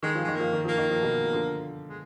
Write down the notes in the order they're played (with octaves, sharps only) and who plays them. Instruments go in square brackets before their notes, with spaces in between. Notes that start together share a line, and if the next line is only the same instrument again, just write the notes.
[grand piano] D#3 [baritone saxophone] G#3
[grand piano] F3
[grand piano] D#3 [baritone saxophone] G#3
[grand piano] F3 [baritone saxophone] A#3
[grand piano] D#3
[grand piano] F3 [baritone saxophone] A#3
[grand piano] D#3
F3
B2 D#3
D3 F3
[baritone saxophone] G#3